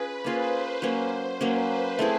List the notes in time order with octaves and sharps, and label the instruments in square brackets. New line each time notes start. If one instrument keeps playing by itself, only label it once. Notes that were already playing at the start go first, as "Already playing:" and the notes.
Already playing: [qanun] C#4 F4 G#4 [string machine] B4
[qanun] A#3 C#4 F4 G#4 [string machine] C5
[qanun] F#3 A#3 C#4
[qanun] F#3 A#3 C#4 [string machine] B4
[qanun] A3 C4 E4 G#4